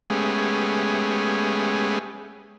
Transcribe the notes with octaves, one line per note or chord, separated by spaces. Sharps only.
G#3 A3 B3 C#4 G4 G#4